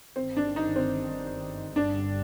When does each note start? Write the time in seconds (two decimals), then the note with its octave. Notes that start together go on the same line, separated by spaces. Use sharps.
0.16 G1 G2 D#3 C4
0.37 D4
0.56 D#4
0.76 C4
1.75 G1 G2 D3 G3 D4